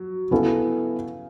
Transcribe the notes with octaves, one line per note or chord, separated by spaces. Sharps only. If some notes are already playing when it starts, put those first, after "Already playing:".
Already playing: F#3
C#3 B3 C#4 E4 A4